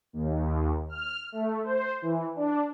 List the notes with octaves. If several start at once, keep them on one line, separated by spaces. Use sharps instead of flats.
D#2
F6
A3
C5
E3
D4